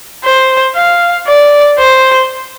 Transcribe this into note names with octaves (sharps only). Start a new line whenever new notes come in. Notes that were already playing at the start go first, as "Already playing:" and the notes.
C5
F5
D5
C5